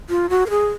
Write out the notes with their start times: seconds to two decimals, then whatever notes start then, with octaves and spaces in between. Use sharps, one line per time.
0.10 F4
0.30 F#4
0.46 A#4
0.50 G#4